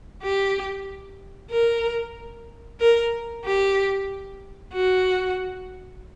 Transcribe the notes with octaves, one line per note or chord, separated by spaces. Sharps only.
G4
A#4
A#4
G4
F#4